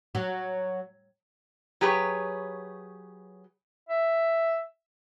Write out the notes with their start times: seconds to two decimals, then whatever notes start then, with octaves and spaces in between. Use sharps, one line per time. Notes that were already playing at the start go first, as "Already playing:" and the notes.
0.15 F#3
1.81 F#3 G4 G#4 B4 C#5
3.89 E5